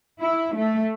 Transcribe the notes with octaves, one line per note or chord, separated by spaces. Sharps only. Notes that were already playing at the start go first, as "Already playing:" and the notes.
E4
A3